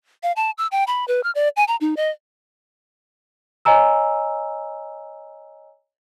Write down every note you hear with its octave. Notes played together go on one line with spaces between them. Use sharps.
F5
A5
E6
G5
B5
B4
F6
D5
G#5
A#5
D#4
D#5
C#5 D#5 G#5 A#5 E6